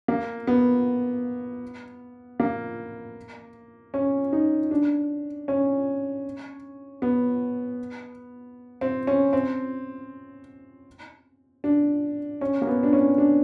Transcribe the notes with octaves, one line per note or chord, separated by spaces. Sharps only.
A#3
B3
A#3
C#4
D#4
D4
C#4
B3
C4
C#4
C4
D4
C#4
A#3
B3
D4
C#4
D4